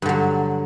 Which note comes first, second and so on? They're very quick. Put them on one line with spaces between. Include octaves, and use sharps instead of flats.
G2 D3 F#3